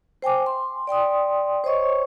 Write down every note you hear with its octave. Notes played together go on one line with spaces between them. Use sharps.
C5 G5 G#5 D6
C6
D5 G5 C6 D#6
C5 C#5 D#5 C#6